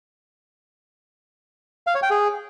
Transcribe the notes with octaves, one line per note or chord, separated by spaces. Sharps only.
F5
C#5
G5
G#4